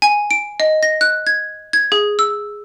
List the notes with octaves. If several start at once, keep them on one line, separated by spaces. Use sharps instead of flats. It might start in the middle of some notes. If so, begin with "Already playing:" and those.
G#5
D7
D#5
A#6
F#6
G#6
G#6
G#4
E6